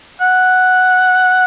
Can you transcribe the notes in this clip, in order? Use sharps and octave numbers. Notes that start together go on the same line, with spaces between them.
F#5